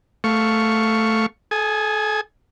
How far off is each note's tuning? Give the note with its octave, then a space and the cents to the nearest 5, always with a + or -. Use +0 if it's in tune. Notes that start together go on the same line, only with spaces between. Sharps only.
A3 +0 F5 +0 C#6 +0
A4 -35 G#5 +0 D#6 +0